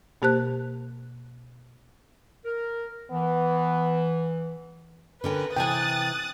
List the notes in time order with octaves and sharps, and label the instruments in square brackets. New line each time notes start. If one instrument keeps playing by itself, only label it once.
[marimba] B2 A#3 G4 C5 A5 F#6
[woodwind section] A#4
[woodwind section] E3 [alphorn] B3
[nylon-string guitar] D3 C#4 G5 [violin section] A#4 B4
[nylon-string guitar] C3 E3 G#5 [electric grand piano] G5 [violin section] D#6 F#6 A6